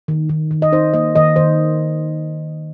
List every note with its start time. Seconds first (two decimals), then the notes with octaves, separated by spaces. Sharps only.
0.08 D#3
0.29 D#3
0.51 D#3
0.62 D#5
0.72 D#4 C5
0.94 A#3 D#5
1.16 D#3 D#5
1.36 D#3 C5